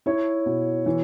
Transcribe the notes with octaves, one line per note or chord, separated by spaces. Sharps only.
E4 C#5
B2
E3